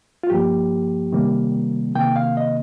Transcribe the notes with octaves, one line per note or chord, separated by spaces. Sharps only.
F4
G2 F3 A#3 G4
C3 D#3 G3 A#3
C3 D#3 A#3 G5
F5
D#5